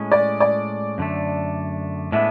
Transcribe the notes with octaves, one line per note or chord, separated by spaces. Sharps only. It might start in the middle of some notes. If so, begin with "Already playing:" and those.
Already playing: A2 G#3 C#4
D5
D5
F#2 D3 A3
A2 G#3 B3 D4 E5